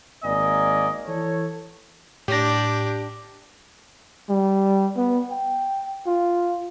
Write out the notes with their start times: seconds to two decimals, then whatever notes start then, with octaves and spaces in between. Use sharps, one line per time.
0.23 G#1 A#3 D5 D#5 G#5
1.06 E3 A4 C#5
2.28 A2 D4 G4 A#6
4.29 G3
4.96 B3
5.31 G5
6.07 F4